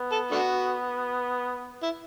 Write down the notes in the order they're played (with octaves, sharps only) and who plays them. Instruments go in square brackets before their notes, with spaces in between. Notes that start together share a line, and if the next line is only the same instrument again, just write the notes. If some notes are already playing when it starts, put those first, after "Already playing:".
Already playing: [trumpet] B3
[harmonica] A4
A3 D4 F#4
E4